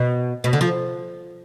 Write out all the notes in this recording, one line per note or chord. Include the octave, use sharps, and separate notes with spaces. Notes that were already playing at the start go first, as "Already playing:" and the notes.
Already playing: B2
B2
D3
F3